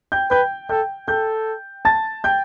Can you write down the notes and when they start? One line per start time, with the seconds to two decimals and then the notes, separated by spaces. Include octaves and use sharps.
0.12 G5 G6
0.31 B4 G5 G6
0.69 A4 G5 G6
1.08 A4 G5 G6
1.85 A5 A6
2.24 G5 G6